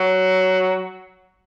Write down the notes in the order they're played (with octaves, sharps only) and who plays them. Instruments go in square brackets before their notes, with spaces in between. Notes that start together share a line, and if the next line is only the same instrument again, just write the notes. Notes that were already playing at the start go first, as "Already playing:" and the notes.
Already playing: [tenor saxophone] F#3